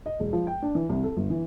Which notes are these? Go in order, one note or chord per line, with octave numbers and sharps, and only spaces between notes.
D#5
E1
F3
G5
D4
E3
C2
A4
G1
E3